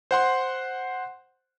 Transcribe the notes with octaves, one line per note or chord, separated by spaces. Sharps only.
C5 F#5 C6